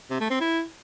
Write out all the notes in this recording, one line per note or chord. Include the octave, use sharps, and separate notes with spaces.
C3
A3
C4
E4